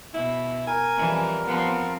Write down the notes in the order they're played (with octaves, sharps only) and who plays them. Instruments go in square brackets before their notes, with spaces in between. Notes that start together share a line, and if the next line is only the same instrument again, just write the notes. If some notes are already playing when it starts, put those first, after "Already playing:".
[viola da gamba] B2 [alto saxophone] E4
[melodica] A#4 [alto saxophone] G#5
[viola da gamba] F2 E3 G3
[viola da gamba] F3 C4 [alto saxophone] B3